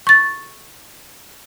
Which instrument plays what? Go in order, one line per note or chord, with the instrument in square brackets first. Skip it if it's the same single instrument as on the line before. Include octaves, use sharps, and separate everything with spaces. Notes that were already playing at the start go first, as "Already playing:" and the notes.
[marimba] C#6 A6